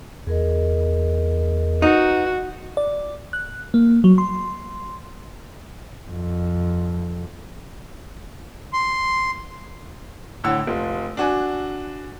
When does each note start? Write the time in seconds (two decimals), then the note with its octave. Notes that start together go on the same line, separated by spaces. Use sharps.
0.27 E2 G#4 A#4 D#5
1.82 D#4 F#4 B4
2.77 D5
3.33 F#6
3.74 A#3
4.04 F#3
4.18 C6
6.10 F2
8.73 C6
10.44 A2 D3 F#5 E6
10.67 F1 F4
11.17 D4 F#4 G#5